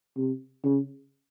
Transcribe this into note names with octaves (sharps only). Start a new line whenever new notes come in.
C3
C#3